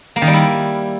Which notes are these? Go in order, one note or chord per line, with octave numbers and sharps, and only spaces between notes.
A#3
D#3
G3
E4